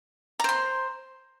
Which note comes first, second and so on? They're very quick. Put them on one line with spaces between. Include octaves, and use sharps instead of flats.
A#5 C5 C6